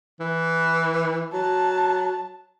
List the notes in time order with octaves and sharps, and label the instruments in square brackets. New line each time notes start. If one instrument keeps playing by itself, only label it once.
[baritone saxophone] E3
[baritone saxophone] F#3 [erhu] A5